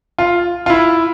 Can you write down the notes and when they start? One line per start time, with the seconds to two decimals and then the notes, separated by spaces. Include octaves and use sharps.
0.18 F4
0.66 F4
0.70 E4